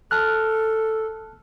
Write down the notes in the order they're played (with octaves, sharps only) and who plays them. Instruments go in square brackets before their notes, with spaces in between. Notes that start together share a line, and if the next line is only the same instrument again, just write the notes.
[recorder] A4 [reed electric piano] A5 F6 F#6